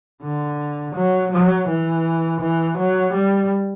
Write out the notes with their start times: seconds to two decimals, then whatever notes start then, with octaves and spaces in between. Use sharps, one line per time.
0.22 D3
0.96 F#3
1.32 F#3
1.69 E3
2.41 E3
2.78 F#3
3.14 G3